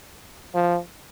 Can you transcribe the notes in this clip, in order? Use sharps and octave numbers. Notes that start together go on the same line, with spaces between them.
F3